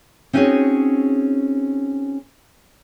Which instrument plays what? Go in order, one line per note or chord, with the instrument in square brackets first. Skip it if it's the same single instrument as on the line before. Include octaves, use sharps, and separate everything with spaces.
[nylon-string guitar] C4 C#4 D#4 F#4 G#4 C#5